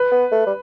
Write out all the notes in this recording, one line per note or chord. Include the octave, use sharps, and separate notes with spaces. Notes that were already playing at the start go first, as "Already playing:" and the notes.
Already playing: B4
B3
A3
G3